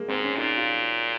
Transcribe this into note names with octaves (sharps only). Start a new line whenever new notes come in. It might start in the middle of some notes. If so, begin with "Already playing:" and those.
Already playing: G#3 A#3
G#2 C4
C#4
A#2 D#4
F4